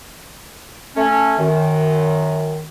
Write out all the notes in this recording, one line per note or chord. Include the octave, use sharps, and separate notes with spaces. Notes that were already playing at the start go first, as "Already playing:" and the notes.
A3 C#4
F#2 D#3